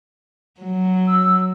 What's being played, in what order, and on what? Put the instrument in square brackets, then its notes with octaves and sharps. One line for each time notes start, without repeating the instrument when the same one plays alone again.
[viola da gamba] F#3
[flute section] E6